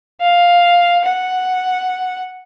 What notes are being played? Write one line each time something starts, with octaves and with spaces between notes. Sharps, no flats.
F5
F#5